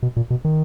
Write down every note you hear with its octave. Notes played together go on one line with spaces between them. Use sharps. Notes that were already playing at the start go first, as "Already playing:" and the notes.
B2
A#2
B2
D#3